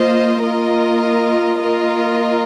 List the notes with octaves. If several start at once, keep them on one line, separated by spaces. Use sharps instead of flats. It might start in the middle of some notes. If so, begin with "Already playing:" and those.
Already playing: A#3 F4 C5 D#5
A#3 F4 A#4 D#5
A#3 F4 A#4 D#5